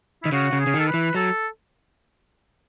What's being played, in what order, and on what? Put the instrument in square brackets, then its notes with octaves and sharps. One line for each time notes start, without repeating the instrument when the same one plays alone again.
[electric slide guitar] D#3 [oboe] E4
[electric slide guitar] C#3 [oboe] F#4
[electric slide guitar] C#3
[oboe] G#4
[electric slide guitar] C#3
D#3
[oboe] A4
B4
[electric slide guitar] E3
[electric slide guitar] F#3 [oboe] A4